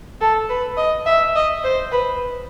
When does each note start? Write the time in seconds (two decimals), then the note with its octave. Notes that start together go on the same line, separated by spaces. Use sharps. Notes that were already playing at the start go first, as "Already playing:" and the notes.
0.21 A4
0.49 B4
0.77 D#5
1.06 E5
1.35 D#5
1.64 C5
1.92 B4